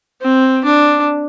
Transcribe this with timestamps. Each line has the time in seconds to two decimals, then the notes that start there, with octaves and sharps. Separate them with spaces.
0.21 C4
0.64 D4